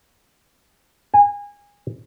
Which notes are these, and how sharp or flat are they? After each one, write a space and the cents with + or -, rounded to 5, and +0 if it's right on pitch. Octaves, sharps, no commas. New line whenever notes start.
G#5 -25